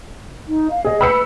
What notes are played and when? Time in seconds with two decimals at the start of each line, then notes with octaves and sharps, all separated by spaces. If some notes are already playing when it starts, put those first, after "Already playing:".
0.48 D#4
0.71 F5
0.85 G#4 D#5
1.01 B4 B5 E6 C#7